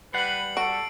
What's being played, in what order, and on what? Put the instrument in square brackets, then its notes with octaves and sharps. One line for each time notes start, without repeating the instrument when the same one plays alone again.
[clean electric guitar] G3 F#5 [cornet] B4 [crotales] C7 F#7
[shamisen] F#4 [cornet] A4 [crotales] D7